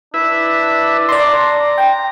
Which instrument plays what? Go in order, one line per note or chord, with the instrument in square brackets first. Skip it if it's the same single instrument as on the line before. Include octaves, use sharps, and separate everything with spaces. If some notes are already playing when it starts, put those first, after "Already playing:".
[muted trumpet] D4 [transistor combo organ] E4 B4 E5
[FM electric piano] D5 C6 [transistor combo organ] A#5
[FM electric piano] G5